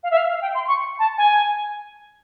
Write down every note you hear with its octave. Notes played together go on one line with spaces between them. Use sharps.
F5
E5
F5
F5
G5
C6
C#6
A5
G#5